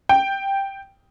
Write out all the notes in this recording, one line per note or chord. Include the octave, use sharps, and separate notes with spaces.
G5